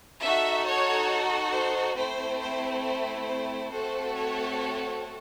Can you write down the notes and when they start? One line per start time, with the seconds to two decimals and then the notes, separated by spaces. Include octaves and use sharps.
0.22 D#4 F#4 A4 E5
0.66 C#5
1.52 C5
1.96 A3 C4 E4 C5
2.40 C5
2.84 C5
3.27 C5
3.71 A3 C4 F#4 A4 C5
4.15 C#5